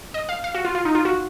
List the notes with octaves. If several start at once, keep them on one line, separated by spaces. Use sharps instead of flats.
D#5
F5
F5
F#4
F4
F4
D#4
F4
F#4